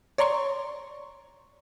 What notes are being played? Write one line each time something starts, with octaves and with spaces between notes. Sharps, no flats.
C#5 D5 A#5 C6 C#6